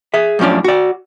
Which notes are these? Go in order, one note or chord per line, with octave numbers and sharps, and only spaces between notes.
G#4 E5
F#2 A2 F3 C#4 D4
F#4 D5